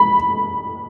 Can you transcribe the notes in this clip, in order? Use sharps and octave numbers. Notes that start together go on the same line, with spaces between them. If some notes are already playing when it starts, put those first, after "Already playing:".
Already playing: B5